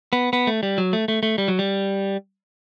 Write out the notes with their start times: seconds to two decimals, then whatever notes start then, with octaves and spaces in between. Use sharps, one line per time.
0.13 B3
0.33 B3
0.47 A3
0.63 G3
0.78 F#3
0.93 A3
1.08 A3
1.23 A3
1.38 G3
1.48 F#3
1.59 G3